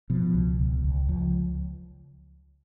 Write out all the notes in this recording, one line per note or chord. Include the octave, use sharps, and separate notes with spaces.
B2 F3
C#2
C#2
C#2
C#2 F3